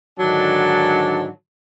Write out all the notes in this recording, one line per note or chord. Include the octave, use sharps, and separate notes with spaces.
G#2 D3 D#3 F#3 D4 A5